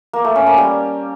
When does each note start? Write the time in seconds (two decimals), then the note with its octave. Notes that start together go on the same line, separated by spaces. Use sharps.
0.13 A#3
0.24 A3
0.36 C#4
0.47 A#3
0.58 G3